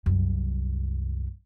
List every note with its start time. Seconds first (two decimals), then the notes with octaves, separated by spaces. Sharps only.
0.06 C2 F#2